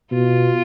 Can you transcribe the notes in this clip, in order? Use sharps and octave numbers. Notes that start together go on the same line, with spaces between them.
B2 F4